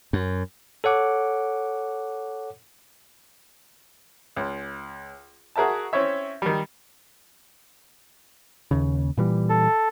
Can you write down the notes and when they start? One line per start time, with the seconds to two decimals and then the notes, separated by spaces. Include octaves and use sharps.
0.13 F#2
0.84 A4 C#5 F#5 D6
4.36 C#2
5.56 F#4 G#4 A#4 E5 A5
5.93 C4 C#4 E4 C#5 E5
6.42 D#3 G3
8.71 D#2 C#3
9.17 A#2 E3 G3
9.49 A4